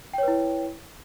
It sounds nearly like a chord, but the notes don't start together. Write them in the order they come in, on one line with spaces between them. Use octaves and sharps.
G5 C#5 B4 E4